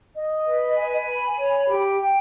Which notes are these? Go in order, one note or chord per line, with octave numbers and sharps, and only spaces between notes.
D#5
B4
G#5
B5
C#5
G4
G5